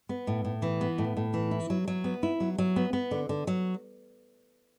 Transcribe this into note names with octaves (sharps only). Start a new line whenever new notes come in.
B3
A2
A2
E3
B3
A2
A2
E3
E4
F#3
F#3
B3
E4
F#3
F#3
B3
B3
D3
D3
F#3